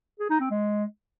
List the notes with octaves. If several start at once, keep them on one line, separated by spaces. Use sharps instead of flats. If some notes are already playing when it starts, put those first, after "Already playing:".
G#4
D#4
C4
G#3